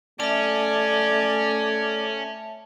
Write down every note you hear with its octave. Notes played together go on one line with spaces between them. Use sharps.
A3 C#4 D5 E5 A5